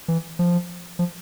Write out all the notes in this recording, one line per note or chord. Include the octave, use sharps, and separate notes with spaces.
E3
F3
F3